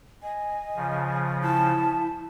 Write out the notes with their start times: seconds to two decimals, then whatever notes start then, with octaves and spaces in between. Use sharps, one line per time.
0.23 D#5 G#5
0.76 C#3 F3
1.42 E4 A5